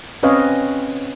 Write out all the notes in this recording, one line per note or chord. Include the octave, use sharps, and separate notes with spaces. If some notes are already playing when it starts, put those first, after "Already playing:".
C4 C#4 B4 C#5 D#5 F5